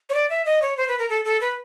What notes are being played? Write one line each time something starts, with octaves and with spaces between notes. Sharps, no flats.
C#5
D5
E5
D#5
C#5
C5
B4
A#4
A4
A4
B4